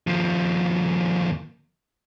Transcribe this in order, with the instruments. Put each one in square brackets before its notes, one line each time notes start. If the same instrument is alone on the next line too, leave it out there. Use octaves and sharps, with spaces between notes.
[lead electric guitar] D#2 F3